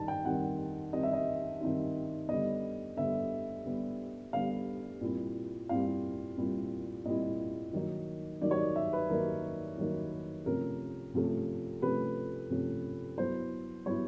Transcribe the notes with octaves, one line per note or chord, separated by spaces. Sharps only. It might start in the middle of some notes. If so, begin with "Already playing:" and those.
Already playing: D#3 G3 D#4 A5
G5
D#3 G3 C4 D#4 F#5
D#3 G3 C4 D#4 D#5
E5
D#5
D#3 G3 C4 D#4
D3 G3 B3 D#5
D3 G3 B3 E5
D3 G3 B3
D3 G3 B3 F5
A#2 G3 C4 E4
A#2 G3 C4 E4 F5
A#2 G3 C4 E4
A#2 G3 C4 E4 D#5
D#3 F#3 A#3 D#4
D#3 F#3 A#3 D#4 D5
C#5
D5
E5
B4
D#3 F#3 A#3 D#4 A#4
D#3 F#3 A#3 D#4
C3 F3 A3 C#4 A#4
C3 F3 A3 C#4
C3 F3 A3 C#4 B4
C3 F3 A3 C#4
F#3 B3 E4 C5
F#3 B3 E4 C#5